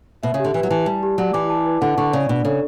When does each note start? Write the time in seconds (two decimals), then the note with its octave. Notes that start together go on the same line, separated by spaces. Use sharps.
0.23 B2 E5
0.34 C#3
0.40 D3 G4
0.54 E3 B4
0.63 F#3
0.70 E3 A5
0.86 G3 A5
1.03 G4
1.18 F#3 D5
1.33 E3 D6
1.50 A5
1.66 B4
1.81 D3 F#5
1.98 D3 C#6
2.13 C#3 D5
2.29 B2 D4
2.45 C#3 A4